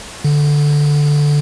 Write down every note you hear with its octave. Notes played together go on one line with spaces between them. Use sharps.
D3